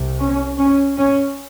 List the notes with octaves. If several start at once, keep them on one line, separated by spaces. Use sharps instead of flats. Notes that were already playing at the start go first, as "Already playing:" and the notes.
Already playing: C2 C3
C#4
C#4
C#4